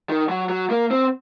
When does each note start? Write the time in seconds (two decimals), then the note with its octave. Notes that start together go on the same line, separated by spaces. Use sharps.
0.09 D#3
0.29 F#3
0.49 F#3
0.70 A#3
0.91 C4